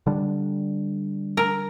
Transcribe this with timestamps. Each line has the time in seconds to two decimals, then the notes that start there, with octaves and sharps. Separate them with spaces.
0.06 D3 G3 D4
1.37 A#4